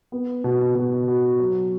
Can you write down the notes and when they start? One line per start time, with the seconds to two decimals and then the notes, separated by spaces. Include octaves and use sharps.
0.12 B3
0.44 B2
0.75 B2
1.08 F#4
1.40 F#3